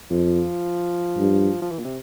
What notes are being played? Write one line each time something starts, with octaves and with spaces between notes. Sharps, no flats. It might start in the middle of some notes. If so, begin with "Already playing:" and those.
F2 F3
G2
F3
E3
A#2
C3